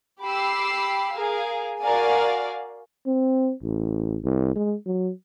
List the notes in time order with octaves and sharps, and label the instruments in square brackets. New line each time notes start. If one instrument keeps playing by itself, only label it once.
[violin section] G4 B5 D6 E6 C7
G#4 A#4 F5
F#4 A#4 D5 F5 G#5
[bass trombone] C4
A1
C2
G#3
F#3